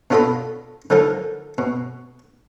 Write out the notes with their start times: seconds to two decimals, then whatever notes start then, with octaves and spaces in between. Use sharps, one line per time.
0.10 B2 D4 F4 A4 D#5 B5
0.90 D3 F3 D#4 A4 A#4
1.58 B2